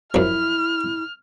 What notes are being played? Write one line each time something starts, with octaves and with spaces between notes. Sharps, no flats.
F#2 F3 E4 F6